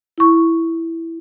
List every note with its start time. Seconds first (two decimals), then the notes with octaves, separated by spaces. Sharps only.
0.18 E4 C#6